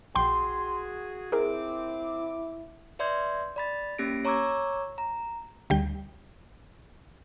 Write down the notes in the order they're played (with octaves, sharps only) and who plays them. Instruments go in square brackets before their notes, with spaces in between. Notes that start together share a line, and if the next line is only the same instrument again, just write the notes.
[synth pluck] A#1 G5 [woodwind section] F#4 G#4 [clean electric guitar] C6
[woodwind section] C4 D6 [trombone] E4 [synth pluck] G#4 A#4
[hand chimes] B4 D5 E5 C6 G6 G#6
D5 B5 A6
A#3 C#4 G4 A#6 D7
C#5 A#5 C#6 D6 E6 G#6
A#5
[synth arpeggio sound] D2 G3 G5